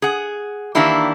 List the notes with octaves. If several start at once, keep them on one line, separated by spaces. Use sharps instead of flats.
G#4 F#5
D#3 E3 A#3 D4 E4 G4